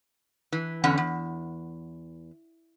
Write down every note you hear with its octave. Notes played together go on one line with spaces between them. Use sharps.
E3
E2 D3 C#4 F#5
E2